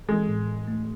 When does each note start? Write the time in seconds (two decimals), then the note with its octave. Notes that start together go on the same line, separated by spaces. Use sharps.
0.09 E3 G#3
0.28 A2
0.48 A2
0.68 A3